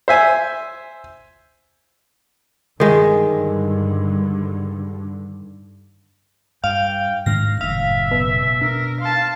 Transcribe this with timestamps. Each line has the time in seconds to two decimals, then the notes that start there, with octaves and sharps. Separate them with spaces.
0.08 C5 E5 G#5
2.80 G2 D3 D#3 G#3
6.64 G2 F5 G5
7.26 G#2 D#3 D4 F5 A#6
7.61 F#1 A2 E5 F5
8.11 B2
8.62 D4 A#4
9.01 F5 A5 C6